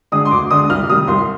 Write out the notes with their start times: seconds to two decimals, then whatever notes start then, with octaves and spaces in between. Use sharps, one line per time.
0.12 D3 G#3 D#6
0.25 C6
0.31 D2 D6
0.51 D3 G#3 D#6
0.70 C2 F6
0.89 C3 D#3 G3 D#6
1.07 C2 C6